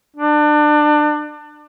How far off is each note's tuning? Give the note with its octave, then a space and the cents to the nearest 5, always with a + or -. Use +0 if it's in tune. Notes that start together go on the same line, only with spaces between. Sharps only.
D4 +30